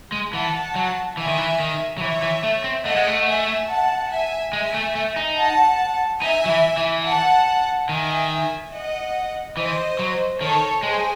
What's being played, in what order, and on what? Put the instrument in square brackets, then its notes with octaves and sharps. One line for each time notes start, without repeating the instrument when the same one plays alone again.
[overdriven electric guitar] G#3
[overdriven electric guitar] E3 [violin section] F#5 A5
[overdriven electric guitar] F#3
[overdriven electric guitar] E3 [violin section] E5 G#5
[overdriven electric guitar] D#3
E3
D#3
F#3
[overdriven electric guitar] E3 [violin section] C#5 E5
[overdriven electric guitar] E3
A3
C4
[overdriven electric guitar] A3 [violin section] D#5 F#5
[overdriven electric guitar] G#3
A3
[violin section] E5 G#5
F#5 A5
E5 G#5
[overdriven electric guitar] G#3 [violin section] E5 G#5
[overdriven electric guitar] A3
A3
D#4
[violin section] F#5 A5
[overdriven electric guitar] D#4 [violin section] E5 G#5
[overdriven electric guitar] F#3
E3
E3
[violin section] F#5 A5
[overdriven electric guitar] D#3 [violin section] E5 G#5
[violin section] D#5 F#5
[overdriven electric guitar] E3 [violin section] C5 D#5
[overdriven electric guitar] F#3
[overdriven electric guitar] D#3 [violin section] A4 C#5
[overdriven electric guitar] G#3 [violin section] G#4 C5